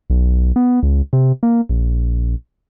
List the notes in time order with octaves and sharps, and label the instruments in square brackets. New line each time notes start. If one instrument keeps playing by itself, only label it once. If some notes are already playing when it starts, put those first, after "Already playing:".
[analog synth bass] B1
B3
C#2
C3
A#3
A#1